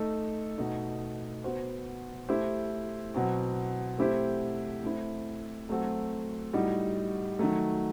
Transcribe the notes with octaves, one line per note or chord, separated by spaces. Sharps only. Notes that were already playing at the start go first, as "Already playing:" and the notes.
Already playing: A3 D#4 A4
B2 A3 D#4
B3 F#4 C5
A3 E4 G4 C5
B2 F#3 C4
A3 C4 E4 G4 C5
A3 C4 E4
F#3 A3 C4 F#4 A4
A2 G3 D#4 F#4
D#3 F#3 A3